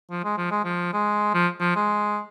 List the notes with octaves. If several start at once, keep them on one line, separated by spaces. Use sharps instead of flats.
F3
G#3
F3
G#3
F3
G#3
F3
F3
G#3